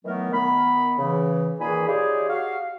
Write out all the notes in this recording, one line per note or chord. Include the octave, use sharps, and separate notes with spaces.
D#3 E3 F#3 A3 B3 A#4
D#3 B3 B5
C#3 E3
A#2 D#3 E3 G#4 G#5 B5
D#4 F4 G4 G#4 C#5 D5
F#4 F5